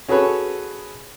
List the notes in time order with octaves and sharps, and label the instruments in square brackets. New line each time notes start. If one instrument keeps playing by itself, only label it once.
[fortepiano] C#4 F#4 G#4 A4 B4 C#5